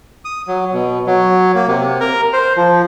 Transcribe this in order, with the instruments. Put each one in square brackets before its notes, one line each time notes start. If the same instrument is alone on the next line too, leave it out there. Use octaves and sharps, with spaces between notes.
[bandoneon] D#6
F#3
B2
F#3
A#3
C3
A#4
C5
F3